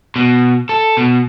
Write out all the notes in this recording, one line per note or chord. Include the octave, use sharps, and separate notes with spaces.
B2
A4
B2